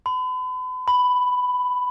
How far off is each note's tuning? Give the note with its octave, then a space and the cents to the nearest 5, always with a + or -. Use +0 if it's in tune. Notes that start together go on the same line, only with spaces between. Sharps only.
B5 +40
B5 +10